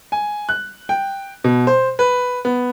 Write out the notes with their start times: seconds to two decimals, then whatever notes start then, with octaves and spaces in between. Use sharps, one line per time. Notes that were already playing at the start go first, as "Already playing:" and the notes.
0.12 G#5
0.49 F#6
0.89 G5
1.44 B2
1.67 C5
1.99 B4
2.45 B3